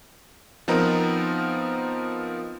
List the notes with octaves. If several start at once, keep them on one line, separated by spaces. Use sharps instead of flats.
F3 B3 C4 D#4 A#4